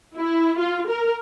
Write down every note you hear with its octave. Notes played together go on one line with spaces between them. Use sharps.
E4
F4
A#4